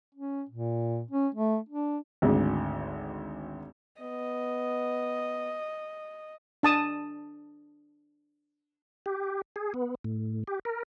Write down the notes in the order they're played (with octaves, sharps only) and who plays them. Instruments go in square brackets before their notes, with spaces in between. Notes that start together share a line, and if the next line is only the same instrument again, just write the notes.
[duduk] C#4
A#2
C#4
A3
D4
[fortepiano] G#1 D2 G#3
[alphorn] B3 [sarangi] D#5
[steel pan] D4 A5 D#6
[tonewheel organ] G4
G#4
B3
A2
G4
A#4